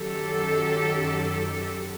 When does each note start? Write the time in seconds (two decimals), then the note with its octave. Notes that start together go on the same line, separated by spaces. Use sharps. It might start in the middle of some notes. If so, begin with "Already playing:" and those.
Already playing: F#2 D#3 F#3 G4 A4